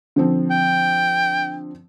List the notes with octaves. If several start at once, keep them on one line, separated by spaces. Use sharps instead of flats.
D3 F3 C4
G5